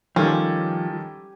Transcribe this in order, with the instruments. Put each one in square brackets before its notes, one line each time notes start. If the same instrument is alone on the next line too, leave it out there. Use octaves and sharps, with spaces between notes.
[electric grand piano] D#3 G3 A4 [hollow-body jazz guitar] F3 [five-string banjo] C#4 [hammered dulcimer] G4 G#5